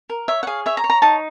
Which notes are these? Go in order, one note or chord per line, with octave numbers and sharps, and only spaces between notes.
A#4
C#5 E5
F#5
G#4 F5
C#5 E5
A#5
C#5
A#5
D#4 A5